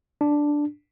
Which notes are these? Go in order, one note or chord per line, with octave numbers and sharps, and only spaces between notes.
D4